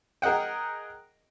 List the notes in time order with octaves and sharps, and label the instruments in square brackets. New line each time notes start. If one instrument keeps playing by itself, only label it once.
[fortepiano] G#4 A#4 D#5 F#5 G5